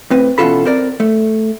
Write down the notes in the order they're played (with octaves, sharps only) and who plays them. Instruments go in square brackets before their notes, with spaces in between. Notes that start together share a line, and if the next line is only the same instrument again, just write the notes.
[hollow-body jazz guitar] A2 C4 B4
B2 E3 C#4 F4 A4 B5
C4 A#4 D5
A3